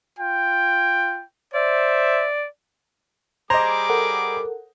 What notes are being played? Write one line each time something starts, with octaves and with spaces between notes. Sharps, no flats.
F4 G5
C5 D5 E5
G3 G#4 C5 D#5 A#5 D6 G#6
A4 A#4 F#5